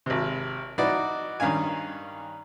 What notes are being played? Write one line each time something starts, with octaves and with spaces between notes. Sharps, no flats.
G#1 C3
D#4 E4 F#4 B4 D5
G2 D#3 C#4 F5 G#5